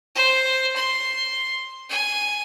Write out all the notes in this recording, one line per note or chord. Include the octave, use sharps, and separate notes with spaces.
C5
C6
G#5